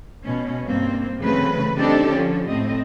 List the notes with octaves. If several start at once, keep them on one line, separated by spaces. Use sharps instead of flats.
B2 C#4
G2 A#3 C4
C#3 E3 F#3 A3 C4 B4
C4 D4 D#4 G4 A4 D5
D3 F3 C#4
A2 A3 C4 D#5